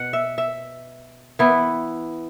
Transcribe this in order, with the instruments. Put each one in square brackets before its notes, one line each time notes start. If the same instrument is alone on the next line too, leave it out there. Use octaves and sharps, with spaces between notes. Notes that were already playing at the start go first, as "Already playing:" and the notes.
Already playing: [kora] B2 F#5
E5
E5
E3 B3 E4